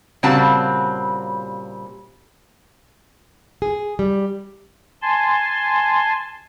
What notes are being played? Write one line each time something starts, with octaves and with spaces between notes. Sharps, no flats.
A#2 C#3 G3 C4 F#4 A5
G#4
G3
G#5 A5 C6